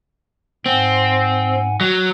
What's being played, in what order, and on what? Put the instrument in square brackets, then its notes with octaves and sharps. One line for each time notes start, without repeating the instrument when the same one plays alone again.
[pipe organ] G#2 F#5 G#5 [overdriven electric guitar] C4
[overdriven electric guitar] F#3